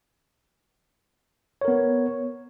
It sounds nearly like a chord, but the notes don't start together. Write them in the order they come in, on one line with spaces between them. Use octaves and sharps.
C#5 A#4 B3